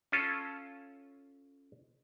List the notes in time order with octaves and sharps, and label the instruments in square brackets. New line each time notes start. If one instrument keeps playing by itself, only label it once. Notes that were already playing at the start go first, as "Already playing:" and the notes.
[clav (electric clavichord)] C#4 F4 A4